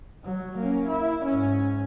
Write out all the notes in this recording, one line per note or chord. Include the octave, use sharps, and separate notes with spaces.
F#3
A#3 C#4
E4
G#2 C#4